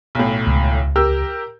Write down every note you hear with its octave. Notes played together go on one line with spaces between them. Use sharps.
B1 A2
C#2
G4 A#4 E6